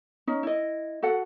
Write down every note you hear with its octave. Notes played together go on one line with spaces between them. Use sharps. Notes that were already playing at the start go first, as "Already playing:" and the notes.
C#4 D#4
E4 D#5
F#4 A4 F#5